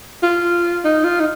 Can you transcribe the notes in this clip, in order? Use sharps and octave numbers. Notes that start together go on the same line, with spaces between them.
F4
D#4
F4
D#4